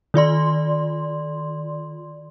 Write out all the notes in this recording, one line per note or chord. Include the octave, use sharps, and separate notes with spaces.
D#3 F4 D5 C6